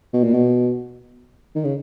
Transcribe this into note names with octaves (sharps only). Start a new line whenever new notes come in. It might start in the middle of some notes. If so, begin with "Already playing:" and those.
B2
A#2
B2
D#3
C#3